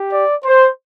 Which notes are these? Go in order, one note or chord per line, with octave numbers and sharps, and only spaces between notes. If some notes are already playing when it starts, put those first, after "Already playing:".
Already playing: G4
D5
C5